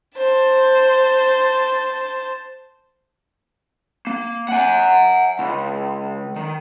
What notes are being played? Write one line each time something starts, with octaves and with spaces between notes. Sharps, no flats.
C5 A5
A#3
F#5 G#5
C#2
D#3